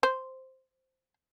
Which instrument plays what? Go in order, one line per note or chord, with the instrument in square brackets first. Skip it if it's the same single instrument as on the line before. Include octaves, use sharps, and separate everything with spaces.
[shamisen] C5